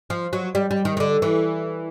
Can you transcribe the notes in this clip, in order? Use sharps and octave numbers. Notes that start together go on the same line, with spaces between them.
F3
F#3
G3
G3
D#3
D#3
D3
E3